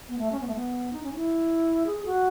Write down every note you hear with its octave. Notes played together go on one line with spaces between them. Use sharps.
B3
A3
C#4
B3
A3
B3
D#4
C#4
D#4
E4
G#4
G#4
F#4